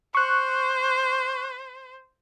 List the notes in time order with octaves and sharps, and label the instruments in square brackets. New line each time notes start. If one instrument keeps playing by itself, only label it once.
[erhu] C5 [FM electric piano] C#6 F#6